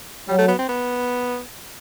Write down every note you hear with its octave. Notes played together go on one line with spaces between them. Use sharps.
F#3 G3
A3
B3
C4
B3